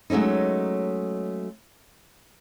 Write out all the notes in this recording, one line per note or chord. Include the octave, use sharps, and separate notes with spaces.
F#3 G#3 A3 C#4 D#4